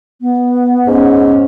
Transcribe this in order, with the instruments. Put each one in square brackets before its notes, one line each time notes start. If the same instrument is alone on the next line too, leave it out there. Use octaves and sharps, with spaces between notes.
[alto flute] B3
[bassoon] G#2 [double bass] C#4